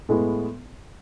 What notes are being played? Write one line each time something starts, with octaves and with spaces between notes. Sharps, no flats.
A2 G#3 B3